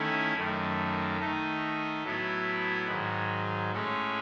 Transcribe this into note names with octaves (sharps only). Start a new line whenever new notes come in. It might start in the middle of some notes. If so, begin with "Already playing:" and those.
Already playing: D#3 A3 C#4 E4
F#2 D#3 A3
D#3 A3 D#4
A2 F#3 B3 E4
G#2 D#3 F#3
A2 G#3 C#4